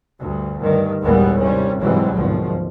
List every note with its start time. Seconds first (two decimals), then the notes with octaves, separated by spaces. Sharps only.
0.18 D2 G2
0.57 G2 D#3
1.01 G#1 D#2 A#2 E3 G3 B3
1.40 C3 G3 C#4
1.81 G#2 C3 E3 F#3 G3
2.14 G#1 D2 B2 F3